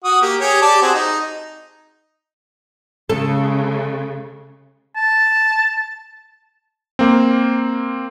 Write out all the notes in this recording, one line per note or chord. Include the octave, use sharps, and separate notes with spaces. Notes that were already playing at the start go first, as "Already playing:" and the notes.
F#4 D#6
A#3 G4
G4 G#4 C#5
G4 D5 A5
C4 F#4 G#4
D#4
C#3 G#3 A4
A5
A#3 C4